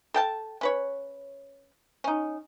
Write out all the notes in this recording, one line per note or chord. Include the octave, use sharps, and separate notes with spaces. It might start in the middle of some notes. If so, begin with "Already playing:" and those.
A4 G5 A5
C#4 B4 C#5
C#4 D#4